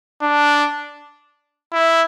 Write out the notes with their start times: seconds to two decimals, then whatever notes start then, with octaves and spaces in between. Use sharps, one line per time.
0.22 D4
1.73 E4